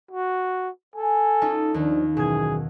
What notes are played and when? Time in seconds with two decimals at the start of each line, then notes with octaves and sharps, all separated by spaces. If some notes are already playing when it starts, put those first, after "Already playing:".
0.11 F#4
0.96 A4 G#5
1.42 C#4 D#4 F4
1.74 D#2 D#3 F3 D4
2.17 F#2 B2 E3 G#4 G#6